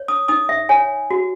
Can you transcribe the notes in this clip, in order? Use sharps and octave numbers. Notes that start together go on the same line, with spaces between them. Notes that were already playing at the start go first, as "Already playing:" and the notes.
Already playing: C#5
D#6
D#4 D#6
E5
C#5 G#5
F#4